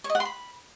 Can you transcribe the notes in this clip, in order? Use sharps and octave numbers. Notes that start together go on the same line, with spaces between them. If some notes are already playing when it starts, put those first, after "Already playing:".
C#5
D#5
F#5
C6
B5